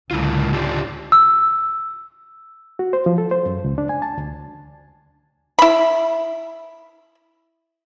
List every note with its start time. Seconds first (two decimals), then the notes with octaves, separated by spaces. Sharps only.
0.11 C#2 A2 D3 G#3 E4 F4
0.53 D4 F4 G4
1.12 E6
2.79 F#4
2.93 C5
3.06 F3
3.18 A4
3.31 C5
3.46 F#2
3.64 C#2
3.78 D4
3.89 G#5
4.02 A5
4.18 D2
5.59 E4 B5